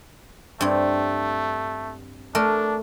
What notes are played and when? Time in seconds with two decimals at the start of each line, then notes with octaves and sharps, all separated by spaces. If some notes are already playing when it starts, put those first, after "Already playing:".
0.61 G2 A3 C4
2.35 A3 D4 A#4